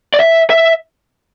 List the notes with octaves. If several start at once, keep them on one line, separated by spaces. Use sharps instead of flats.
D5
E5
E5